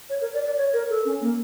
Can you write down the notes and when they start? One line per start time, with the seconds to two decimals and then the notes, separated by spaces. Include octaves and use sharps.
0.10 C#5
0.21 A#4
0.34 D5
0.46 D5
0.57 C#5
0.73 A#4
0.90 A4
1.05 C#4
1.21 A#3